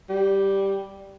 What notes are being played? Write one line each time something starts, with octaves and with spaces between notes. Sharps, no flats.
G3